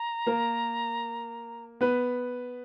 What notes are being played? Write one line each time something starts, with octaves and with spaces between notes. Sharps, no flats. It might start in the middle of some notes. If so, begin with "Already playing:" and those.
Already playing: A#5
A#3 A#4
B3 B4